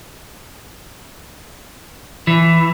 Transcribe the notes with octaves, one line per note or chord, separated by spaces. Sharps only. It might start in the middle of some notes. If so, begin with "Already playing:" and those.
E3